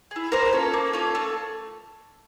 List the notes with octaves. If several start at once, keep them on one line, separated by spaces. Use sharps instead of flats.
E4 G#4
A#3 A#4 C5
C#4 F4 A4
A#3
C#4 F4 A4
A3